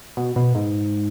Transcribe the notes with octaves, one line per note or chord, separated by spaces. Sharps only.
B2
B2
G#2